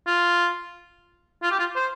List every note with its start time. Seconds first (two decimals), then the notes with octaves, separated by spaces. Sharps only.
0.07 F4
1.43 F4
1.51 G4
1.59 F4
1.76 C5